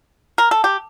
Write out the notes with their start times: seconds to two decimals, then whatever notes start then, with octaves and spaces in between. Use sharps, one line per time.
0.38 A#4
0.51 A4
0.64 G4